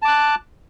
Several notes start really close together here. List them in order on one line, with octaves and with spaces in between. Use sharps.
A5 D6 F#6